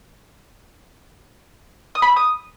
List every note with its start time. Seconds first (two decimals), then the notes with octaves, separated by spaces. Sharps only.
1.95 D#6
2.02 B5
2.09 E6
2.16 D#6